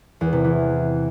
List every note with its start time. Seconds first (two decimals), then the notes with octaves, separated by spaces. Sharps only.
0.21 E2
0.33 C3
0.44 E3